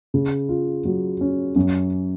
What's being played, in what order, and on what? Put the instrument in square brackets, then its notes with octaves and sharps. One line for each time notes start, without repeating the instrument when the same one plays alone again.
[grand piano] C#3
F4
F#3
C#4
F#2